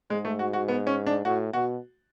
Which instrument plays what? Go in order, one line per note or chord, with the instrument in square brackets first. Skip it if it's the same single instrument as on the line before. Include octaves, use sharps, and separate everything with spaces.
[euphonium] G#2 [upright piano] G#3
[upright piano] A3
F#4
F#4
B3
C#4
D4
[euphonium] A2 [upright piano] F#4
[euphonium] B2 [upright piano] F#4